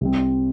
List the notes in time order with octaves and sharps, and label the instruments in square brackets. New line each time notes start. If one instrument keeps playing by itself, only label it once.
[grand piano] C2 C3 G3 C4